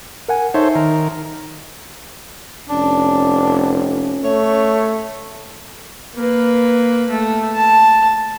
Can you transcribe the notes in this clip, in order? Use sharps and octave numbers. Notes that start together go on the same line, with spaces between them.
A#4 F#5 G#5
D#4 A4 C5 C#5 E5
D#3 A#4
F1 C#4 D4
A3 C#5
A#3 B4
A3
A5